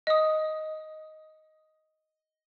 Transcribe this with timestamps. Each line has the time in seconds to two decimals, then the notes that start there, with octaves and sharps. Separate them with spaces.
0.07 D#5 D#6